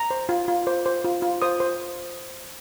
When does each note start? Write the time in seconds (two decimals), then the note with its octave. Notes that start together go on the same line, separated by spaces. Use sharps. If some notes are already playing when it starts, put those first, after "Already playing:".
Already playing: A#5
0.11 C5
0.29 F4
0.48 F4
0.67 C5
0.86 C5
1.04 F4
1.22 F4
1.42 C5 D#6
1.60 C5